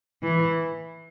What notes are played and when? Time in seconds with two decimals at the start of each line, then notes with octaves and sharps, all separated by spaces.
0.23 E3